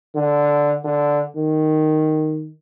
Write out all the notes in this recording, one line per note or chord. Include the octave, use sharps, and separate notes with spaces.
D3
D3
D#3